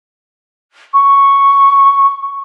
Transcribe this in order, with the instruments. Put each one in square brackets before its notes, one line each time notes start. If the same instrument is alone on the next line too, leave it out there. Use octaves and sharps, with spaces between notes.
[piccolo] C#6